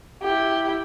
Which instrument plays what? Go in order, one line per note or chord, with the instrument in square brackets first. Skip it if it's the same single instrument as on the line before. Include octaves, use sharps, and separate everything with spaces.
[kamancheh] E4 G4